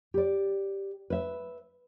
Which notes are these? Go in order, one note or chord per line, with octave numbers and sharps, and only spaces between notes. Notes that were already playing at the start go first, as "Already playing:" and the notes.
G4 D5
B4 E5